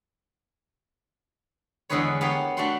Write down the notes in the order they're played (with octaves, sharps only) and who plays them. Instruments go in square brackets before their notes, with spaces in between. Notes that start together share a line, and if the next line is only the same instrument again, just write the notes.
[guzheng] E2 D3 G#3 G#4 B4 C#5
B3 G4 A#4 C#5 F5
A3 D4 F#4 F#5 C6